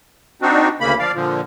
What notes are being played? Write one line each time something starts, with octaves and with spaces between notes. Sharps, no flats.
C4 D4 D#4 F#4
D2 C#3 A#3 B5
F3 D5 F5
A#2 D3 F3